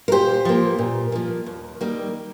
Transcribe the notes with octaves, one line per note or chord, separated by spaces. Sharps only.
A#4
A#2 G4 C5
F3 A#3
A#2
F3 A#3
D#2
D#3 G3 A#3